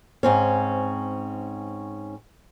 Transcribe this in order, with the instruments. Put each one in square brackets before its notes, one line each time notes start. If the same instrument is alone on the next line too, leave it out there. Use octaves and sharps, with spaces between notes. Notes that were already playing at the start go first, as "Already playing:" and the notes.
[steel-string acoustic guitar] G#2 C4 C#4